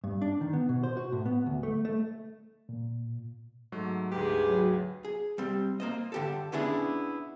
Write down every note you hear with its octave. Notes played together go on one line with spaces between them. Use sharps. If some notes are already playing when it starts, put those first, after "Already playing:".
G2
D4
D#3
B3
B2
C5
F#4
A2
B3
D2
A3
A3
A#2
G#2 F#3 A3
D2 G#2 G4 G#4 B4
F#3
G#4
G3 C4
A#3 C5 D#5
D3 G4 A4
B3 C#4 D4 E4 G#4